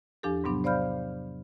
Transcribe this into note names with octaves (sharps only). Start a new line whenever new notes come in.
E2 F3 D4 G4 A4
G#2 C3 F#3 B3 D4
C5 D5 F5 B5 F6 G6